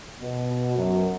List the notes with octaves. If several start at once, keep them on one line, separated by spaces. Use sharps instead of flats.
B2
F#2